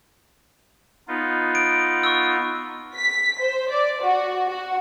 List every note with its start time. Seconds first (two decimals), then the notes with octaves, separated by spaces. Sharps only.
1.08 B3 D#4 F4
1.55 D7
2.04 C#6 E6
2.95 B6
3.41 C5
3.72 D5
4.03 F#4
4.46 F#4